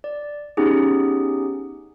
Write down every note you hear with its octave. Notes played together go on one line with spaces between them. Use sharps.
D5
B3 C#4 D#4 G4 G#4